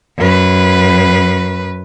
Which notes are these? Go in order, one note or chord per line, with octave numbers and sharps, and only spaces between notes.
F#2 B4